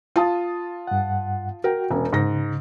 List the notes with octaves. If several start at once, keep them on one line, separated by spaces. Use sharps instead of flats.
F4 A5 D#6
G2 F#5
F#4 A#4 G5
E1 C#4
G#2 C#3 A#6